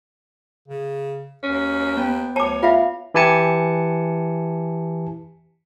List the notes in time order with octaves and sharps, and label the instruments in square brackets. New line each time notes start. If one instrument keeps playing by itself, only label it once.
[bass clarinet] C#3
[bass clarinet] D#2 [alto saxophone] C#4
[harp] B3 G5
[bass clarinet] D2 [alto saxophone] C#5 [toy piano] A5 D6
[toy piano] F4 E5 [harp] F5
[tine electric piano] E3 E4 G4 G#5 A5 C#7